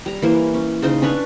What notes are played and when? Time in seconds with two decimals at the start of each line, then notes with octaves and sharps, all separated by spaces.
0.06 G3 A#5
0.22 E3 A#3 C5
0.54 C#4
0.82 C#3 D#4 C5 D#5
1.02 C#4 D4 B4 C#5